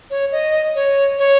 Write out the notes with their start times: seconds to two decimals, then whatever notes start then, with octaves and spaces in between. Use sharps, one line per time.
0.10 C#5
0.32 D#5
0.75 C#5
1.18 C#5